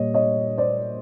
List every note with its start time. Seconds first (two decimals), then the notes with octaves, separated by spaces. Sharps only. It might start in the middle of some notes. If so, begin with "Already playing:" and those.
Already playing: A#2 G3 C#5 D#5
0.14 C#5 D#5
0.58 C5 D5